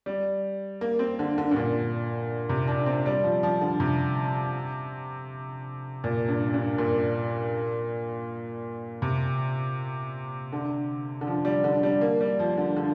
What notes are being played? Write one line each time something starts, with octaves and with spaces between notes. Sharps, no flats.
G3
A#3
C4
D3
D3
G2
A#2
C3
D4
C4
G3
F3
F3
D3
C3
A#2
G2
G2
A#2
C3
D3
D3
F3
G3
D3
G3
A#3
G3
F3
D3
D3